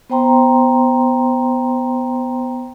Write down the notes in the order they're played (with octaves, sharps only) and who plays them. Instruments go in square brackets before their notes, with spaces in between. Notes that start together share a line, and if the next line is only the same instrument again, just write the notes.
[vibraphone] B3 C5 G5 A#5 C6